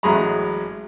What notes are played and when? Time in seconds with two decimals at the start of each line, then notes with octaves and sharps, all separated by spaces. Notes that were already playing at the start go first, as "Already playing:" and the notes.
0.03 A1 F#3 G#3 G#4 A#5 B5